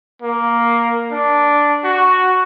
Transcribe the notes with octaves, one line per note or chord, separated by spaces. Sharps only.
A#3
D4
F#4